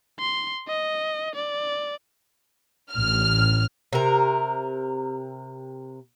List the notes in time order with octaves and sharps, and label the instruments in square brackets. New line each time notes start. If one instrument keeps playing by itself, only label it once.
[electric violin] C6
D#5
D5
[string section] A1 F6
[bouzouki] C3 A#4